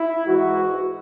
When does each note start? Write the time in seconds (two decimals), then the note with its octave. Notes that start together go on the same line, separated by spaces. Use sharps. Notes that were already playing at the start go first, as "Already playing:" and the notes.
Already playing: E4
0.27 G#2 E3 F#4